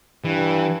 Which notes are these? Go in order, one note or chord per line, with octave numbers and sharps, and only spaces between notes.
G2 E3